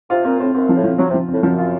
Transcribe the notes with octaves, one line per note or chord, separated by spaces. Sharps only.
C3 F4
A#2 C4
A2 C4
F#2 C4
F3
A2
F3
F3 F#3
C3
F3
A2 C4
F#2 F3
F4